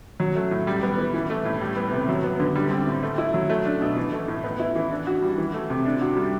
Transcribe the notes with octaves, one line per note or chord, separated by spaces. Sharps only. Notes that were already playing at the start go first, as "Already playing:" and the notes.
F#3
A3
A2
G3
B3
E3
E3
A3
A2
G3
B3
C3
F#3
B3
D3
G3
C4
A2
A3
E4
F#3
A3
D4
B2
E3
A3
A2
B3
E4
E3
D4
F#4
G3
E3
A3
C3
D4
F#4
G3